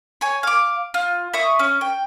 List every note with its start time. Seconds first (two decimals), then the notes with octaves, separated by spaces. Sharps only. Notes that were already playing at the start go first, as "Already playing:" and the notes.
0.21 C#5 G#5
0.43 F5 D6
0.94 F4
1.34 E5 C#6 D#6
1.59 C#4
1.81 G5